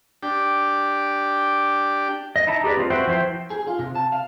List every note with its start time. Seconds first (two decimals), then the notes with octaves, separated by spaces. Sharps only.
0.23 D4 G4
2.36 D#5
2.47 D#4 E4 A5 A#5
2.64 G4 G#4 B4 D5
2.77 C4 F4
2.90 F#4 B4 C5 E5 G5
3.07 F3 E4 C5 G5
3.50 G#4
3.68 F4
3.79 C3
3.95 A5
4.12 F5